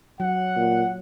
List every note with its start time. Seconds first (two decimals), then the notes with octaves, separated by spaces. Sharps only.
0.20 F#3 F#5
0.56 A#2